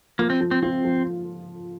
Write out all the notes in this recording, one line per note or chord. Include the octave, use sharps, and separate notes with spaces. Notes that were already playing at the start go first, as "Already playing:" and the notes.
F3 A#3
C4
F3
C4
C4 F4
F3